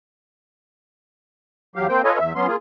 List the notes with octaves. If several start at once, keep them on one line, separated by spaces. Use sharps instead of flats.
E2 F#3 G4 F5
A#3 C4 C5 G5
F4 A4 B4 C#5 D#5 G#5
E2 E5
F#3 B3 C#4 C6
A#3 F4 G#4